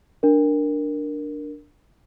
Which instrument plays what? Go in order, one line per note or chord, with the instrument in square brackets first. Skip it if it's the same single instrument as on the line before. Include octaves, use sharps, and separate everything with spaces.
[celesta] D4 A#4